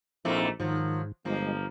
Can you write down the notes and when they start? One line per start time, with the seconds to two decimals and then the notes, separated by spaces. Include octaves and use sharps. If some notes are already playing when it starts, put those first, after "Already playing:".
0.25 A#1 G#2 F3 A3 A#3 C4 E4
0.60 G#2 D#3 F3 F#3
1.25 G1 F3 G#3 A#3